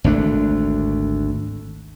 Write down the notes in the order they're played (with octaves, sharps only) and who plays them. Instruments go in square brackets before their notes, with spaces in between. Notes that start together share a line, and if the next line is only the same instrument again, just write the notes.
[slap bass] G#1 D2 A3 D4